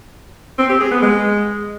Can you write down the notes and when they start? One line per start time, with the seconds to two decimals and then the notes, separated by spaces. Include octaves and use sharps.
0.59 C4
0.70 G4
0.81 G#4
0.91 B3
1.02 G#3